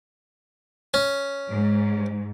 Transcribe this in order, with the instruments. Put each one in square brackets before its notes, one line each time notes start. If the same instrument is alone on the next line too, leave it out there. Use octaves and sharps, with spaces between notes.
[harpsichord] C#4
[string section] G#2